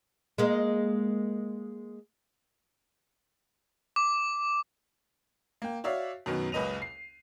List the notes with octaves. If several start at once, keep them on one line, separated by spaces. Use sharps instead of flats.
G#3 A#3
D6
A#3 G5
F#4 C#5 D5 E5 F5
F#2 B2 D#3 B3
F#1 C#2 B4 D#5 D#7 F7
C7